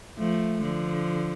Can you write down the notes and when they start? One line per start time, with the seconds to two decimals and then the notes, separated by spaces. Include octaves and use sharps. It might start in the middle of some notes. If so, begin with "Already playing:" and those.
0.17 F3 A3
0.62 D3 F3